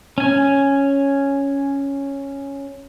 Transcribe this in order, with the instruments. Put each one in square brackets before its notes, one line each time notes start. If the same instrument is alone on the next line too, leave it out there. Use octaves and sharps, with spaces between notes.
[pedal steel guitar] C#4 G#5